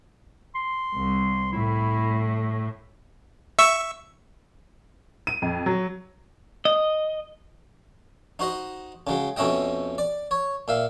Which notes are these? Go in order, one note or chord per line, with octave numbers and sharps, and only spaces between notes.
C6
C2
A2 E4
E5 C#6 E6
D#7
F2
F#3
D#5
D#4 F#4 C5 D#5
C#3 F#3 G#3
F2 B2 C#4 E4 D#5 G5
D5
C#5
A#2 E5 F5